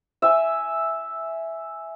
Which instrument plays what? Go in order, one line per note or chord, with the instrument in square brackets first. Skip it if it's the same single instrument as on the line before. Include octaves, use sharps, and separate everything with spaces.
[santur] E5 G#5